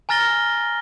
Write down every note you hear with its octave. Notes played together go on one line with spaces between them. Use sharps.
G#5 A#5 F6 A6 A#6 G7